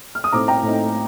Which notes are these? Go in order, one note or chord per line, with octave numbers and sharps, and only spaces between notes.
F6
D#6
A2 A3 C4 D#4 A#5 D6
G5 A#5
A2 A3 C4 D#4